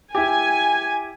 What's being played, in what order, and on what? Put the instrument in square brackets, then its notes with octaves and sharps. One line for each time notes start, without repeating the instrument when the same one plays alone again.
[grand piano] E4 G4 [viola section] G#5